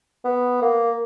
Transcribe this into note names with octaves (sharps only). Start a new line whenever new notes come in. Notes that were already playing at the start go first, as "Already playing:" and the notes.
B3
A#3